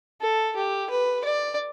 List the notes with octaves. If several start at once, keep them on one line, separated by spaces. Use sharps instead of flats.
A4
G4
B4
D5